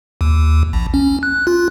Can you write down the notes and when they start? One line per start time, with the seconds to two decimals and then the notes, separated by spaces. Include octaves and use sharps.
0.21 D#2
0.73 A#1
0.94 C#4
1.23 F#6
1.47 F4